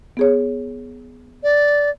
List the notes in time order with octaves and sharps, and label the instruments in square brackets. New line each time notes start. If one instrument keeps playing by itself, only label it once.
[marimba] B3 G#4 C#5
[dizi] D5